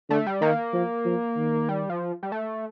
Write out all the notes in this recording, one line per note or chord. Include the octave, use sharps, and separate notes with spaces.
D3 A3
G3
D#3 A#3
F3
F3
D#3
G3
F3
G3
A3